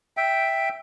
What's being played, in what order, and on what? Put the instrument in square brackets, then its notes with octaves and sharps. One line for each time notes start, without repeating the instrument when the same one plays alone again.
[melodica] E5 G5